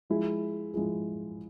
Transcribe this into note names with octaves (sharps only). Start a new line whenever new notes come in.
F3 G#3 E4 G#4
F3 G#3 E4 G#4